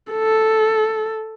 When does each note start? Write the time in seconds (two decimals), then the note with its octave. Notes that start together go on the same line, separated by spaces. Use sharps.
0.12 A4